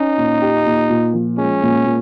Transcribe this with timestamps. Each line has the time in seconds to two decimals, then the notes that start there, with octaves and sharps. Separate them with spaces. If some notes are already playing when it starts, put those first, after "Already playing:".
Already playing: C#4 D#4
0.18 A#2
0.42 G4
0.66 A#2
0.90 A#2
1.13 F3
1.38 G#3 C#4
1.63 A#2
1.85 A#2